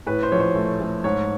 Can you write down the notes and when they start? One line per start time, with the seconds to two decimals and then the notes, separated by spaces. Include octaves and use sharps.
0.06 A2 B4
0.23 C5
0.32 A#1 C#5
0.40 C5
0.55 A3
0.80 A3
1.04 G#2 C#5